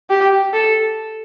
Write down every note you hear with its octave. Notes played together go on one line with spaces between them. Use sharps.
G4
A4